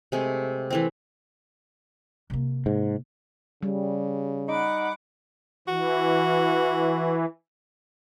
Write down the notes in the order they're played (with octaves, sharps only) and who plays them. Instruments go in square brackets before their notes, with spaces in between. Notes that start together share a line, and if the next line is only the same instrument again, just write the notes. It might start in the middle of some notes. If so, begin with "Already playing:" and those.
[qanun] C3 G#3 A3
E3 A3 C4
[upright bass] C3 A#3
[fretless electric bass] G#2
[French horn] C#3 [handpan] G3
[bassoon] D#4 [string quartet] F#5 B5 D6
[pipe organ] E3 [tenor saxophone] F#4